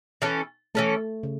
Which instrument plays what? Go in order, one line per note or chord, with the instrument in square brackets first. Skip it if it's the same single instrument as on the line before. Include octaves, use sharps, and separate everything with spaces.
[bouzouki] E3 C#4 A4
[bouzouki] E3 C#4 A4 [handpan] A3
[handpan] C#3